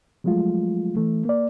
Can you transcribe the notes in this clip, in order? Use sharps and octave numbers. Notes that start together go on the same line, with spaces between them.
F3 F#3 G#3 A3 F4
E3 A3
A#3 D5